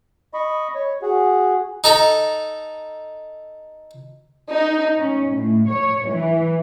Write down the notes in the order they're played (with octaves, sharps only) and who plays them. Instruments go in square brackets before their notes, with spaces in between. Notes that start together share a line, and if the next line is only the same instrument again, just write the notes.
[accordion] D#5 B5 C#6
C#5
F#4 G#4
[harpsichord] D#4 A4 A#5
[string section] D#4
C#4
A2
C#5
E3